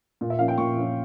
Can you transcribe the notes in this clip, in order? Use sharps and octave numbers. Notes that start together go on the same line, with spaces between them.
A#2
E5
F3 A#3 C#4 F5
G5
A#2 C#6
F3 A#3 C#4